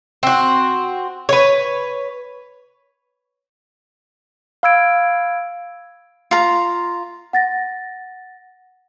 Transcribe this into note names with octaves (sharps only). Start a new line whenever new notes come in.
C4 F#4
B4 C#5
F5 B5 E6 G#6 D7
F4 F5 A#5
F#5 A6 A#6